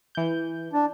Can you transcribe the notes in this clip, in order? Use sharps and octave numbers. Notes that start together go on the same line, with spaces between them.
E3 G6
D4